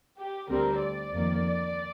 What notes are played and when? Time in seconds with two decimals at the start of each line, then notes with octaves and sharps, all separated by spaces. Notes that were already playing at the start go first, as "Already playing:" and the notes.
0.18 G4
0.50 D2 D3 G3 C4 A#4
0.82 D5
1.15 F2 D#3 A#3